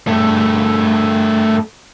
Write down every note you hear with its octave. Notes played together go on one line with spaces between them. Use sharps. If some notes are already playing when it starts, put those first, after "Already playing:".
G2 A3